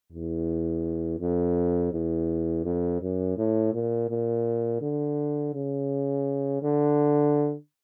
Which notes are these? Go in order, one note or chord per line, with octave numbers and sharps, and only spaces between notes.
E2
F2
E2
F2
F#2
A2
A#2
A#2
D3
C#3
D3